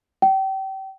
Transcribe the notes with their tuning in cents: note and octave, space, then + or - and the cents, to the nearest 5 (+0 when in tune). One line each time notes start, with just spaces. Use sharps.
G5 -30